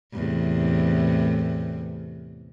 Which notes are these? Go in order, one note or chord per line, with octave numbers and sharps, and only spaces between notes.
E2 A2 C3